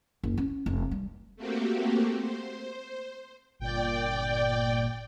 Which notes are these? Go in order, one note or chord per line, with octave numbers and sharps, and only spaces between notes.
F#1
C#4
F1
G3
A3 A#3 C4 F#4 G4
C5
G1 A#2 D5 G5